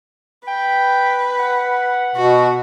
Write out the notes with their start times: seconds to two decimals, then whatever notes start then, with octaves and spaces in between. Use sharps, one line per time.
0.48 B4 G5
1.39 F#5
2.16 B2 F#4